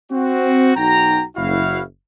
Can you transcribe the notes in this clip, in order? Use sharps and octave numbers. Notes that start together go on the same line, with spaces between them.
C4 F#4
B1 D#4 F#4 G5 A#5
F#1 E4 F#4 F5